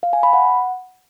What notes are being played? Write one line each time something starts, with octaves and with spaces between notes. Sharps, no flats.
F5
G#5
B5
F#5